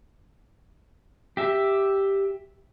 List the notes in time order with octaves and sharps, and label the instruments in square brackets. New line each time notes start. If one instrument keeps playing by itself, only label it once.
[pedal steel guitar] G4 E5